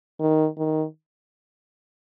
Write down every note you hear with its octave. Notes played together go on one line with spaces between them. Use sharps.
D#3
D#3